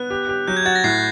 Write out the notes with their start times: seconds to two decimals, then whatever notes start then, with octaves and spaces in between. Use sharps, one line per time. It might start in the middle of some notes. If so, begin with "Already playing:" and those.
Already playing: B3 F#6
0.10 G4
0.29 G4
0.48 F#3 G6
0.57 G#6
0.66 F#4 A6
0.75 A#6
0.84 A2 C7